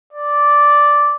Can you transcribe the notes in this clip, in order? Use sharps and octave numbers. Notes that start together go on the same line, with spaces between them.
D5